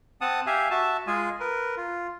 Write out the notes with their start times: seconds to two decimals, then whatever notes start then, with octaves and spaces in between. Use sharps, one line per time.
0.21 C4 F#5 A5 D#6
0.46 G4 E5 F5 G#5
0.70 F#4 E5 A5
1.07 G#3 F4 G#4 G#5
1.40 A#4 B4
1.77 F4